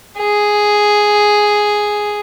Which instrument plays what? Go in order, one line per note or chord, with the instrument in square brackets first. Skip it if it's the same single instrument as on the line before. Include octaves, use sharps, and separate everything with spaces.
[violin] G#4